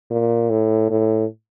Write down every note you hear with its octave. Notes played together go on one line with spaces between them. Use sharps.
A#2
A2
A2